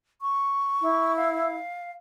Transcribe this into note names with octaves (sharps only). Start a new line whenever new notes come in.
C#6
E4
F5